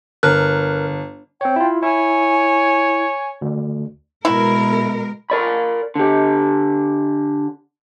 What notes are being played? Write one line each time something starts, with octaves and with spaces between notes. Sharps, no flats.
G1 A#4 F6 F#6
C4 C#5 G5
E4 F4
E4 C#5 G#5
D2
B2 G#3 E4 A#4
A#4 D5 B5
D3 G4